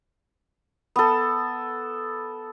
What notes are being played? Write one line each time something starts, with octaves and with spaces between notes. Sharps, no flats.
B3 A4